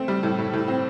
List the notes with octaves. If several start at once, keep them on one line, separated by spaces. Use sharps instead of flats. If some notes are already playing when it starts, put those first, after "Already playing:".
Already playing: A3 C4
G3
A2
A2
A2
C4